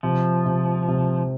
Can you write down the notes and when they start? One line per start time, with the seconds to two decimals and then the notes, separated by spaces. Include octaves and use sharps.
0.03 C3 F3
0.46 C3
0.88 C3